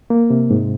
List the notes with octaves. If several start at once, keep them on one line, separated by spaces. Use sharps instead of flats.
A#3
C3
G#2